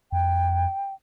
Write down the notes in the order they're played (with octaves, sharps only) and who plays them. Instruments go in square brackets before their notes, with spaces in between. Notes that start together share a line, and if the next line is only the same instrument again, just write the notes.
[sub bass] F2 [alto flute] G5